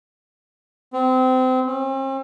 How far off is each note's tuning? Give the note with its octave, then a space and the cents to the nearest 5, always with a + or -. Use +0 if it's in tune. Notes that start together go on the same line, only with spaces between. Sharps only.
C4 -25
C4 +45